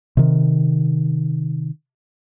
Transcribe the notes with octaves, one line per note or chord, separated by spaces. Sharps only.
C3 D#3